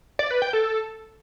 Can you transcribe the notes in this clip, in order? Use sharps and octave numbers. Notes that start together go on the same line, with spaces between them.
D5
B4
G5
A4